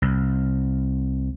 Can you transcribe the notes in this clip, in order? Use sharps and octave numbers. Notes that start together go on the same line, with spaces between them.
C2